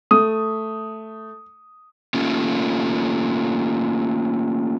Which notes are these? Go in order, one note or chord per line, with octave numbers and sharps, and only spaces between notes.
A3 D#6
A3 A#3 C#4 F4